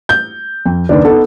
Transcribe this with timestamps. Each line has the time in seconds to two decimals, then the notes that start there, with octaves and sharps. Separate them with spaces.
0.09 G6
0.66 F2
0.89 F#1 D#2 D4 B4
1.05 B3 D#4 A4